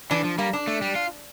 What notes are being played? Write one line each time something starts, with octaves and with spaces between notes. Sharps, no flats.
E3 D4
F3
G3 A#3
D4
A3
G3
F4